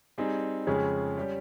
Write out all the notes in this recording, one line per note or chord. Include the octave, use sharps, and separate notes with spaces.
G3 C4 D#4 G#4
F2 C#3 G#3 C#4 G#4
G3 C#4 G4